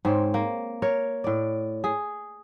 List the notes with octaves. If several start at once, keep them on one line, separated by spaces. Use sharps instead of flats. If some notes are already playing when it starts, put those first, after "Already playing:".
G#2 C4 C#5
A#3
A#4 C#5
A2 D5
G#4